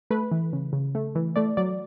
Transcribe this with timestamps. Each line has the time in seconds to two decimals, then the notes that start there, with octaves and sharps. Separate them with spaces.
0.10 A3 B4
0.31 E3
0.53 C#3
0.73 C#3
0.95 A3
1.15 E3
1.36 A3 D5
1.57 F#3 D5